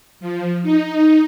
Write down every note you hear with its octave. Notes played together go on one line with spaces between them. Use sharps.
F3
D#4